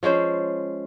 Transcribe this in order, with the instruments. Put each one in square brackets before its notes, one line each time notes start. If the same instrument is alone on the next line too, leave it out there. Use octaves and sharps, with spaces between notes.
[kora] F3 G#3 C#4 C5